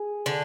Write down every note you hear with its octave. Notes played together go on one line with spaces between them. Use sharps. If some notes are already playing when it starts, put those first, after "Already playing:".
Already playing: G#4
D3